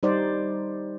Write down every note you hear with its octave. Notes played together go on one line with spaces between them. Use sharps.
G3 D#4 C5 D5